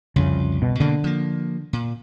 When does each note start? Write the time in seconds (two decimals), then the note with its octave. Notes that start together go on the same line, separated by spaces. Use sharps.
0.16 C2 F2 C#3
0.62 B2
0.80 B2 D3 A#3
1.04 F3 A#3
1.73 A#2